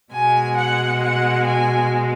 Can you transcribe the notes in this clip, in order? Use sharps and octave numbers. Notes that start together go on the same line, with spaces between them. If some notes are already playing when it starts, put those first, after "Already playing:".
B2 G#3 G#5
F#5
F#5
G#5